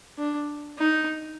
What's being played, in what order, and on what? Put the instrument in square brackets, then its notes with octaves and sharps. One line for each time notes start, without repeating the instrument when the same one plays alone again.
[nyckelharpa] D4
D#4